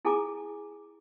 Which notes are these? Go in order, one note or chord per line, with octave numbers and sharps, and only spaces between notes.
E4 G#4 A4 G#5 A#5 D6